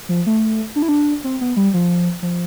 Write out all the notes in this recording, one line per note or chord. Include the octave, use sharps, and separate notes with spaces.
F3
A3
D4
E4
D4
C4
B3
G3
F3
F3